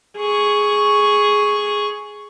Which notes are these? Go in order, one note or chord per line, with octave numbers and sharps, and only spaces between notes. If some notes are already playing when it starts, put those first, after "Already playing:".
G#4 C#6